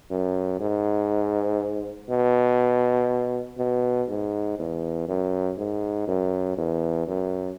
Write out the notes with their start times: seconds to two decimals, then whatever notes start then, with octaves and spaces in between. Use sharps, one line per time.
0.11 F#2
0.60 G#2
2.09 B2
3.58 B2
4.09 G#2
4.58 E2
5.08 F#2
5.58 G#2
6.08 F#2
6.57 E2
7.07 F#2